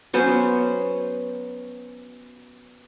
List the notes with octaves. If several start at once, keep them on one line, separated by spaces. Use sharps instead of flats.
F#3 B3 C#4 C5